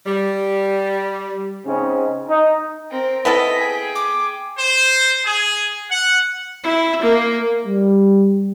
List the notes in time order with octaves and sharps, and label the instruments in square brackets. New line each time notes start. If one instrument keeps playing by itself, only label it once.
[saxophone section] G3
[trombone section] G#2 C#3 C4 C#4
D#4
[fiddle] C4 A#4
[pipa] B3 E4 A4 [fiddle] D#5 [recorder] B6
[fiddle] G#4 G5
[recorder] D6
[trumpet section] C5
G#4
F#5
[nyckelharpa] E4
A#3
[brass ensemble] G3